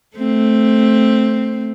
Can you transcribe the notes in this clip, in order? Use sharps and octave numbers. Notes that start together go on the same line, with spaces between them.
A3 C4